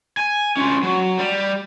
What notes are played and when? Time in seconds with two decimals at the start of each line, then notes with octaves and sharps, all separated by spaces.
0.17 G#5
0.57 C#4 F4
0.83 F#3
1.19 G3